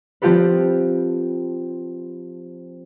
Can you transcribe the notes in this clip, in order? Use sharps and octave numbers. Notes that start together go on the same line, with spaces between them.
F3 C4 F4 G4 A4 B4